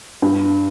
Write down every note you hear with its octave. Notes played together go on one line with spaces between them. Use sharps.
G2